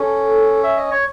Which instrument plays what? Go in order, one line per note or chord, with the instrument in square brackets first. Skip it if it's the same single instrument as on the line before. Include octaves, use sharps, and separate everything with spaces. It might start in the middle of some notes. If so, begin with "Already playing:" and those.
Already playing: [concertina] C#4 [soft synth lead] A4
[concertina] E5
D#5
C#5